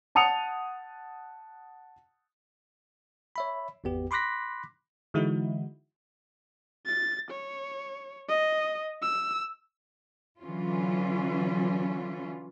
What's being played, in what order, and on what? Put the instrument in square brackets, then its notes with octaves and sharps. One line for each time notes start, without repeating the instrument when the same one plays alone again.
[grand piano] F#5 A5 D#6 C#7 F7
[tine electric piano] C#5 E5 B5
G#1 E2 B3 G4
B5 C6 D6 F#6 A#6 B6
[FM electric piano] D3 E3 G#3 D#4 E4 F#4
[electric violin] A6
C#5
D#5
E6
[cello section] D3 E3 F#3 C#4 F4